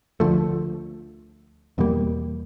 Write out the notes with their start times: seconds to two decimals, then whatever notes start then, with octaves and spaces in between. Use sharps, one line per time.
0.20 D2 D3 F3 A3
1.78 E2 B2 G3 A#3